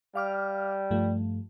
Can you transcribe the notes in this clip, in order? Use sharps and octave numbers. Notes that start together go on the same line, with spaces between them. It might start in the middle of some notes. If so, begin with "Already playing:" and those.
G3 F5 D6 F6
G2 F3 A3